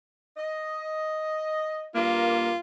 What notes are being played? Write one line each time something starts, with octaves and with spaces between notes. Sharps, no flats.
D#5
G2 A#3 F4